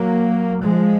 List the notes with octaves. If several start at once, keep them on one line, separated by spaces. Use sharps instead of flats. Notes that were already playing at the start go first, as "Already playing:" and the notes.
Already playing: F#3 A#3
F3 G#3